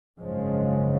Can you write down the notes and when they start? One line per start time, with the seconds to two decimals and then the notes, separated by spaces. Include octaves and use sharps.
0.20 G#1 F#2 C#3 F3 G#3